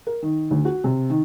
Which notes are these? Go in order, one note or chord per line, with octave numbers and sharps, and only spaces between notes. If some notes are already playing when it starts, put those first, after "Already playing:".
A#4
D#3
D2
F#4
C3
D#3